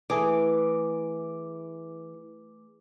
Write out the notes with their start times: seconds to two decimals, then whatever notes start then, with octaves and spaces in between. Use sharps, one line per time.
0.10 E3 A3 G#4 D6